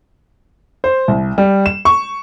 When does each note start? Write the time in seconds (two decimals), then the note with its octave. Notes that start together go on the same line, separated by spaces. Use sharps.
0.84 C5
1.08 C2
1.38 G3
1.66 E7
1.85 C#6